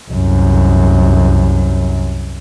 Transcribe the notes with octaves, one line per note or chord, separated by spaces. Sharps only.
C2 F#2